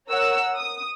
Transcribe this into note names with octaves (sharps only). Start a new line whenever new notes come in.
A#4 C#5 F#5 E6
D#6